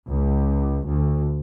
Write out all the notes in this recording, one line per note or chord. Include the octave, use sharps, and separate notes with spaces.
C#2
D2